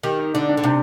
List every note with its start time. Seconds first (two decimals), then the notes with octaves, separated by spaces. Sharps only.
0.03 D#3 G4
0.19 D#4
0.34 D3 D4
0.49 D4
0.57 D3
0.64 C3 D4